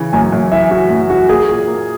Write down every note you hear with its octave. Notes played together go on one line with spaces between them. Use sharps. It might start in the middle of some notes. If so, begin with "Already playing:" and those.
Already playing: C#3 E3
F#2 G#5
F#2
E3 E5
E3 F#4
F#2
E3 F#4
A#3 G#4
A#2
A#3